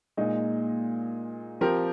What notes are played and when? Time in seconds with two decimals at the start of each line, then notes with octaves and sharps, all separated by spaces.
0.17 A#2 G#3 D#4
1.61 F3 C4 G4 A#4